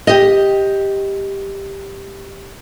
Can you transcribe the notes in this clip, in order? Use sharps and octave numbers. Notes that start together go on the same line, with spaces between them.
G4 D#5